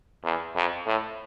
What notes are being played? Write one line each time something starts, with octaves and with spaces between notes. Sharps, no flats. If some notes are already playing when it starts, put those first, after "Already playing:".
E2
F2
A2